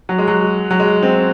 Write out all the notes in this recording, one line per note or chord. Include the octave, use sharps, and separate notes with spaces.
F#3
G#3
F#3
F#3
G#3
C4